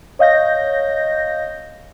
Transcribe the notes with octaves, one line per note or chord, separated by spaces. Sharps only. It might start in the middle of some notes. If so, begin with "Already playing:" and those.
C#5 D#5 F5 G6 A#6